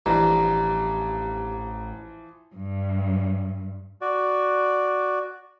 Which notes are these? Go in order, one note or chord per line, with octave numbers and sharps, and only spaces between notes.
A1 G2 E3 F3 A#5
G2
F#4 D5